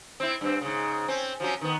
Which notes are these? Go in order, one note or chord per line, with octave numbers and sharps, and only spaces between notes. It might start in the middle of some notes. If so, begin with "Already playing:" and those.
C4 E4
G2 C4
G#2 C#3
C4 C#4
F3 F#3 C#4
D#3 B3